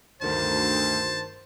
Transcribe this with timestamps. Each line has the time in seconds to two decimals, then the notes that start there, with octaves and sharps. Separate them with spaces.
0.22 D2 G2 D#3 C5 A5